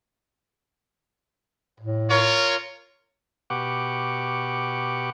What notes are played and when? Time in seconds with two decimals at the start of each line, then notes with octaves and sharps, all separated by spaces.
1.80 A2
2.11 F4 A#4 C#5
3.50 B2 G4 F#5 C#6 D6